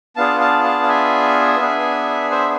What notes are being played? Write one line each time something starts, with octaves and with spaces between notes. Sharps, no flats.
B3 D4 F4 G#4 F5 A5
F5 A5
F5 A5
F5
E5 G#5
B3 D4 G#4
C5 E5